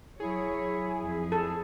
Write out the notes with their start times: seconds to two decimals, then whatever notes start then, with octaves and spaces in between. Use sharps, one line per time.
0.20 F#3 E4 G#4 C#5
1.00 F2
1.32 A4